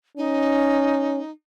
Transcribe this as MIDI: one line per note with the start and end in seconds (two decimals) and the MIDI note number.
0.17 1.20 61
0.17 1.31 63